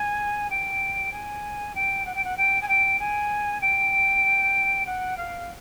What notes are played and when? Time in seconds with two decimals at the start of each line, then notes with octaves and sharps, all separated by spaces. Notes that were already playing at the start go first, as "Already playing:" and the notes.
Already playing: G#5
0.50 G5
1.12 G#5
1.75 G5
2.05 F#5
2.15 G5
2.24 F#5
2.37 G5
2.62 G#5
2.68 G5
2.99 G#5
3.61 G5
4.86 F#5
5.17 F5